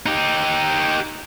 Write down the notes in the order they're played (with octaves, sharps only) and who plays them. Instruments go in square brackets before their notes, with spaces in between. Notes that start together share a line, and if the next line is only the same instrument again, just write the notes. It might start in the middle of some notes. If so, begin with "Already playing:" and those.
[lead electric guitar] D#4 G4